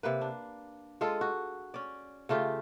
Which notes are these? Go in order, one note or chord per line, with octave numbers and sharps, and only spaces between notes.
C3 A#3 B4
D4
G#3 F4 G#4 A4
F#4
C#4 D5
C#3 A3 F4 G4